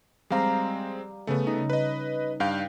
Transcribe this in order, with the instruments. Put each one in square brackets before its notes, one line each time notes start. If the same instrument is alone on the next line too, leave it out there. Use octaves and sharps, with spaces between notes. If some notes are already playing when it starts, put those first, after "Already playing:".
[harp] G3 F5 A#5 [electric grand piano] G#3 C4
[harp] C#3 [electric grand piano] A3 B3
[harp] D#4
[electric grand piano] B4 D#5
[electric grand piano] G2 F5 G6 [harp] G5